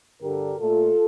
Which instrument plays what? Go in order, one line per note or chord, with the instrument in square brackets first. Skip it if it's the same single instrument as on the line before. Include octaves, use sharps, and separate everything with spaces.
[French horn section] G2 D3 G3 G4 A#4
A#2 A3 F4 A4